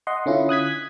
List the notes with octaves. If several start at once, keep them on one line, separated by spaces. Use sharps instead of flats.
D#5 F#5 C6
D3 C#4 E4 F4
D#6 F#6 G#6 B6